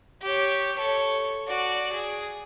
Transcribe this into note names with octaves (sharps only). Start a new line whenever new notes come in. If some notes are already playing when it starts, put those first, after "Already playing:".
G4 C#5
A4 C#5
F#4 D5
G#4